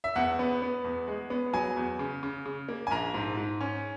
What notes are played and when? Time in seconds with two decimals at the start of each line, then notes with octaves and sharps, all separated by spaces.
0.04 E5
0.16 E2 F#5
0.39 B3
0.62 B3
0.84 E2
1.08 G#3
1.30 B3
1.53 F#3 G#5
1.77 E2
1.99 C#3
2.23 C#3
2.46 C#3
2.69 A#3
2.87 G#5
2.91 A#1 A#5
3.14 G#2
3.37 G#2
3.61 C#4